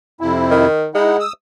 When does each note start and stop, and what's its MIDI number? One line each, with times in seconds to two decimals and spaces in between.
0.21 0.67 41
0.21 0.67 48
0.21 0.67 64
0.51 0.87 51
0.95 1.22 56
0.95 1.17 63
0.95 1.17 64
0.95 1.17 78
1.19 1.33 87
1.19 1.33 88